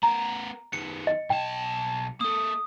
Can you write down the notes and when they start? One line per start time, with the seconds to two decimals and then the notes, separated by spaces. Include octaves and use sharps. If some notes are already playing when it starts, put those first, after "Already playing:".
0.03 B3 A#4 A#5
0.73 D#3 B3 C#7
1.07 D#5
1.30 B1 G5 A5
2.21 A#3 A4 D#6